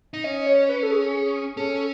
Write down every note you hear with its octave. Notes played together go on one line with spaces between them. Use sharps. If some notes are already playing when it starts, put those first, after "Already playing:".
D#4
C#4 D#5
C#5
B4
A4
G#4
C#4 A4